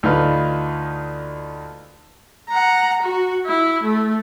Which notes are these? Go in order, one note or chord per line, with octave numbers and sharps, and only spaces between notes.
D2 D#4 F4 B4 F6
F#5 A#5
F#4
E4
A3